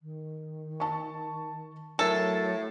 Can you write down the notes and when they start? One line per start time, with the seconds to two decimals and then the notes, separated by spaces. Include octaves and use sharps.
0.02 D#3
0.80 A5 C#6
1.99 A2 F#3 A4 A#4